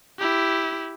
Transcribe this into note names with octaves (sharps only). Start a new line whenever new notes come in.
E4 G4